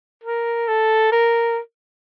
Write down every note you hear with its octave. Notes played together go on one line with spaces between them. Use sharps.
A#4
A4
A#4